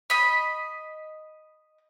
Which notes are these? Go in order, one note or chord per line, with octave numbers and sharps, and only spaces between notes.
D#5 B5